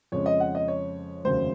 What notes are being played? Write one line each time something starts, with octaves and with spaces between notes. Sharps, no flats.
F2 C#3 G#3 C#4 C#5
D#5
F#5
D#5
C#5
F1 D#2 C#3 F#3 C#4 C5